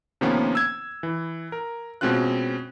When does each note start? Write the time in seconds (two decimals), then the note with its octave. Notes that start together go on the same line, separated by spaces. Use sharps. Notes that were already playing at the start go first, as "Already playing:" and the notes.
0.21 C3 D#3 F3 A#3 B3 C#4
0.55 E6 G#6
1.03 E3
1.52 A#4
2.01 B2 G#3 C4 C#4 F4 F#6